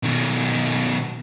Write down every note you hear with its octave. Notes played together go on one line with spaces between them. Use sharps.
B2 D#3